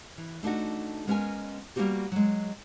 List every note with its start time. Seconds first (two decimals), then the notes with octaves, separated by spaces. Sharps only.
0.18 E3
0.43 A3 D4 D#4 F#4
1.07 G#3 B3 C#4 G#4 A#4 G#5
1.76 G3 A#3 B3 D#4 F#4 G4
2.12 F#3 G#3